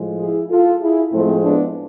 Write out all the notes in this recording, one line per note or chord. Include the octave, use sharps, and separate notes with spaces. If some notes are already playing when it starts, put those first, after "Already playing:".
Already playing: A2 F3 G#3
E4 G#4
F4 A4
E4 G#4
A2 F3 G#3 A3 C4
B3 D4